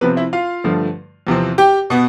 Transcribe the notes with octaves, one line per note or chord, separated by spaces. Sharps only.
C3 F3 B3 C4 B4
E4 E5
F4 F5
G2 D3 F3 A3
E2 C3 F3 C4
G4 G5
B2 B3